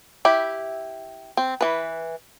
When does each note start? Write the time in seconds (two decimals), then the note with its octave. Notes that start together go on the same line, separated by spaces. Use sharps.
0.25 E4 G4 E5
1.37 C4
1.61 E3 B4